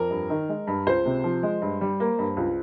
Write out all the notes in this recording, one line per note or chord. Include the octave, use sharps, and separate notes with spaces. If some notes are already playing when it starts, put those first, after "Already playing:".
Already playing: F2 A#4
G2
D#3
G#3
G2
C#2 C5
C3
F3
G#3
G2
G3
A#3
G2
C#2